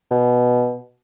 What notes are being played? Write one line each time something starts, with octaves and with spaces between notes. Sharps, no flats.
B2